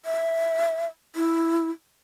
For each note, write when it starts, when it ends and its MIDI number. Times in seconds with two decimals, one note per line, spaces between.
0.05 0.86 76
1.16 1.70 64